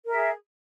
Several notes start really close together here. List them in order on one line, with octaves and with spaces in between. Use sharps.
A#4 E5 G#4